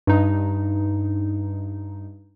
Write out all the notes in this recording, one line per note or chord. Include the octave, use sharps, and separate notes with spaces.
G2 D#4